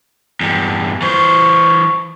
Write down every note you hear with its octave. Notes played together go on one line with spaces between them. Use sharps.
E2 G2
E3 C5 C#6